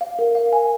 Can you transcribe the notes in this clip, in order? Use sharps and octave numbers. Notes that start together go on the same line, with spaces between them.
F5
A#4
F5
G#5